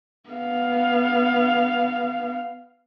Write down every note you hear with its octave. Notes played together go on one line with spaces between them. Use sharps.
B3 F5